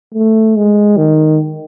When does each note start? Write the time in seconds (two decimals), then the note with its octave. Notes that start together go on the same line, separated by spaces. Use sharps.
0.14 A3
0.56 G#3
0.97 D#3